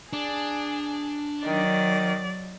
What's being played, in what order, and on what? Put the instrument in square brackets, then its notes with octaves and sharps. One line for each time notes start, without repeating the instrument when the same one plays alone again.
[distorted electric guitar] D4 [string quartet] G#4
[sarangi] D#3 [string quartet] F#3 D5